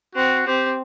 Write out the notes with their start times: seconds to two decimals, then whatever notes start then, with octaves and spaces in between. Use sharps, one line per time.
0.15 C4 F#4
0.46 C4 G4